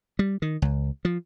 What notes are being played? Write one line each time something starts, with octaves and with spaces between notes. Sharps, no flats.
G3
D#3
C#2
F3